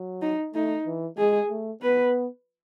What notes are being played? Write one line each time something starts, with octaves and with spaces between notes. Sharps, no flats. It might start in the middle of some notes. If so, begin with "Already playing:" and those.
Already playing: F#3
D#4
A3 D#4
E3
G#3 G#4
A3
B3 B4